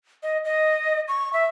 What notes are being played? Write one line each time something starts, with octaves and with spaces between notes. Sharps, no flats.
D#5
D#5
C#6
E5